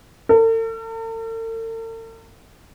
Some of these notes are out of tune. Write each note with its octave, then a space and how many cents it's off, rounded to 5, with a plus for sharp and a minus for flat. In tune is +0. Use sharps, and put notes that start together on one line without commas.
A4 +45